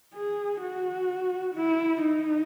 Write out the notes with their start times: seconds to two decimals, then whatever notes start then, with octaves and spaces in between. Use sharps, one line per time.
0.14 G#4
0.61 F#4
1.54 E4
2.01 D#4